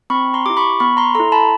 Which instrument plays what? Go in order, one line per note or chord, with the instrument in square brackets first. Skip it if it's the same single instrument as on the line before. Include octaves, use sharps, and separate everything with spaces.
[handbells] C4 B5 C#6
A#5 C6
E4 G4 D6
B5 C#6
B3 B5 C#6
A#5 C6
A4 A#5 C6
E4
A5 B5